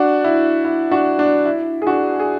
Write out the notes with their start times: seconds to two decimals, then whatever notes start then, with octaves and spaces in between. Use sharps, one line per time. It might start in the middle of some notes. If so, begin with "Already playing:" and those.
Already playing: D4 F#4
0.24 E4
0.65 E4
0.91 D4 F#4
1.19 D4
1.45 E4
1.82 G#4
1.87 D4 F#4
2.19 G#4